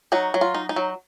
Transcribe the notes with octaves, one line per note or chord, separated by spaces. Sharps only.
F#3 D#4 F#4
F#3
F4
D#4
D#4
F#3